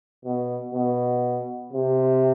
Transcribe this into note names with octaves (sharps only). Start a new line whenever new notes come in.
B2
B2
C3